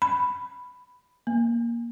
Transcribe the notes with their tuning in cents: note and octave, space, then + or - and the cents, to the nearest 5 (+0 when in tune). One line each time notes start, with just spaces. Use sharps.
B5 +5
A#3 +10